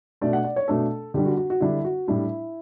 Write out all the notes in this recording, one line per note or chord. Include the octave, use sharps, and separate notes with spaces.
B2 A3 D4 D5
F#5
D5
C#5
B2 A3 D4 A4
D3 G3 D4 G4
F#4
F#4
F#4
D3 G3 D4 E4
F#4
A2 G3 D4 E4